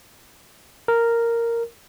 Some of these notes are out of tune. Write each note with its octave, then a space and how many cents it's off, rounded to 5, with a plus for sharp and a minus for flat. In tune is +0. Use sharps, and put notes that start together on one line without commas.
A#4 -5